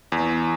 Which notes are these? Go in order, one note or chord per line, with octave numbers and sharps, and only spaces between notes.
E2